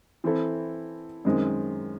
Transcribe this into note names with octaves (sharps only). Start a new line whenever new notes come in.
E3 C4 E4 A4
F#2 D#3 G#3 C4